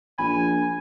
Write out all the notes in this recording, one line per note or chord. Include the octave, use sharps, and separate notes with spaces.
A#1 G#5 B5